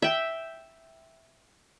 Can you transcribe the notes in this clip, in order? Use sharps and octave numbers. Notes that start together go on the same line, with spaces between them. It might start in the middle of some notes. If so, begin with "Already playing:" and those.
E5 G5